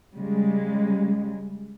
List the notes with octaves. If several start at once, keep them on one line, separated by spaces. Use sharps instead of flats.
C#3 G3 G#3